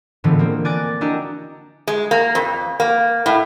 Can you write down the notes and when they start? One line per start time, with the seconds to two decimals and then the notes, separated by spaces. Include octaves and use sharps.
0.24 A2 D3 E3 F3 G#3 B3
0.39 A#3 C4
0.65 D5 G#5 D6 F#6 A6 A#6
1.01 D4 E4 F#4 G4 D#5 A#5
1.87 G#3
2.11 A#3
2.35 F2
2.80 A#3
3.26 A2